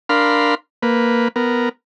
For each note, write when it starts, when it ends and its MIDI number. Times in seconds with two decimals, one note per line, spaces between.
0.09 0.55 62
0.09 0.55 70
0.09 0.55 77
0.09 0.55 83
0.09 0.55 84
0.83 1.28 58
0.83 1.28 71
1.36 1.69 59
1.36 1.69 70